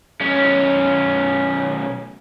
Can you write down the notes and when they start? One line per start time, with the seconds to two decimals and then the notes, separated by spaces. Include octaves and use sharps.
0.20 B1 C#4